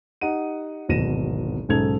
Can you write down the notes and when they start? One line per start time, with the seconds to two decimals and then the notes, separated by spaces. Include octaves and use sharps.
0.21 D#4 G4 F#5 D#7
0.88 D1 G#1 B2 A#6 D#7 E7
1.69 B1 G#2 C#3 A4 G#6 F7